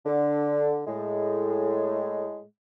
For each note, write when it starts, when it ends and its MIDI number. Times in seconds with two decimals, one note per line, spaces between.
0.06 0.81 50
0.87 2.42 45
0.87 2.42 56